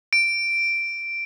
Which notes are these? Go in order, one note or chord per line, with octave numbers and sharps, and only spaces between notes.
D7